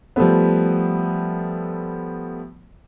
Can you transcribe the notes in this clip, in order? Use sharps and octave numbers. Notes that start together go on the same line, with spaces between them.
F3 G3 A3 B3